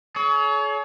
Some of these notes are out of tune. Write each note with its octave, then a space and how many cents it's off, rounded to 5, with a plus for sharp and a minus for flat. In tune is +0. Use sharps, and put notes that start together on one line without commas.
G#4 +45 C#5 +30